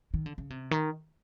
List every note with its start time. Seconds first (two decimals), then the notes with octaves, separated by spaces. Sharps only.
0.14 D#3
0.26 D3
0.38 C#3
0.50 C3
0.71 D#3